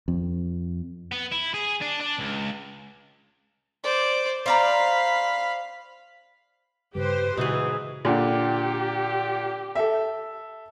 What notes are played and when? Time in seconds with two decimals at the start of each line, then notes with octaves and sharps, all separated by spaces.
0.08 F2
1.12 B3
1.32 E4
1.54 G#4
1.81 D4
2.00 D4
2.19 C#2
3.83 C5 D5
4.46 C5 D5 F5 A#5 B5
6.95 G2 C#3 G3 G4 B4 C5
7.37 A#2 C#3 E3 G#3 D#4 F#4 G#4
8.05 A#2 D3 G4
9.75 A4 E5